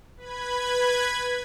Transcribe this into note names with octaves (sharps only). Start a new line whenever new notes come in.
B4 B5 G#6